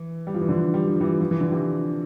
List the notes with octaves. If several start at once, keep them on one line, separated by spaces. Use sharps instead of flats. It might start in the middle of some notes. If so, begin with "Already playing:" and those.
Already playing: E3
G3
F3
E3
D3 F3
G3
F3
E3 G3
F3
E3
D3
C3 E3